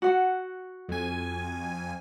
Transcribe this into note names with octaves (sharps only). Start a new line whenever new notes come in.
F#4 F#5
F2 G#5